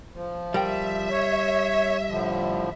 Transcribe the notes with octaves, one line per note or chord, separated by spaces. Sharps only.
F3
G3 A#4 E5 G5
C#5
A2 D3 F3